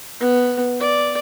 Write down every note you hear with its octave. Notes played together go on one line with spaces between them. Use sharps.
B3
D5